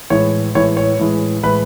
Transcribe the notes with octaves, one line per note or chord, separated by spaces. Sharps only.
A2 E3 G#3 C#5
A2 E3 G#3 C#5
C#5
A2 E3 G#3
A2 E3 G#3 B4